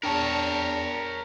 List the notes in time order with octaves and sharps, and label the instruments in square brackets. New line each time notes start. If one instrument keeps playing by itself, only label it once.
[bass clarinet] E2 [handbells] D4 G5 A5 [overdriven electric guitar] A#4 C#5